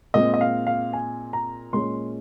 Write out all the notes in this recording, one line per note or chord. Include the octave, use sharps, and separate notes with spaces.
A#2 G#3 C4 D#5
D#5
F5
F5
G#5
A#5
A#2 G#3 C#4 C6